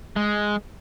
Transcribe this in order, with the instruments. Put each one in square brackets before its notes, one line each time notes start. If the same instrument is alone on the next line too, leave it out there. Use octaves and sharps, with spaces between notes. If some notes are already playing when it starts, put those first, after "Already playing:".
[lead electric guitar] G#3